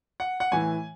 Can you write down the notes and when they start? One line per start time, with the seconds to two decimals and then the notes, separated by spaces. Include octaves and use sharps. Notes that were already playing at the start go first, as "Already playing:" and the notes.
0.20 F#5
0.40 F#5
0.52 A2 E3 G#5